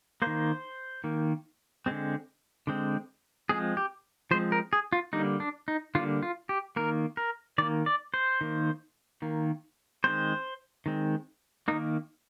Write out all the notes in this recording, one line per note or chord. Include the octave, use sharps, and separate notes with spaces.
D#3 A#3 C5
D#3 A#3
D3 G#3 C4
D3 G#3 C4
F3 G#3 C4 G#4
G4
F3 G#3 C4 C5
A#4
G#4
F4
D3 G3 A#3 D#4
D4
D#4
D3 G3 A#3 F4
F4
G4
D#3 A#3 A#4
A#4
D#3 A#3 D5
D5
C5
D#3 A#3
D#3 A#3
D#3 G#3 C4 C5
D#3 G#3 C4
D#3 A#3 D#4